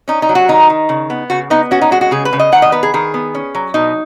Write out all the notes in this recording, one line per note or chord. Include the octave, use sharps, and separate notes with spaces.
C#4 D#4
D#4
F#3
F#4
D#3 D#4
D#3
C#3
B3
C#3 F#4
B3 D#4
C#4 F#4
D#4
G#3 F#4
F#4
C#3 G#4
B4
C#3
D#5
D#3 F#5
D#5
B3 B4
G#4
D#3 G#4
B3
C#4
F#3
B2 D#4